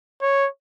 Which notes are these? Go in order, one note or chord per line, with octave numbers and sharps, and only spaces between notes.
C#5